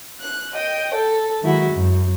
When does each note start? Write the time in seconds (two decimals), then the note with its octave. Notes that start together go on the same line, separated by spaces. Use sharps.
0.20 F#6
0.53 D#5 G5
0.94 A4
1.42 D#3 F#3 G#3 E4 F#4
1.72 F#2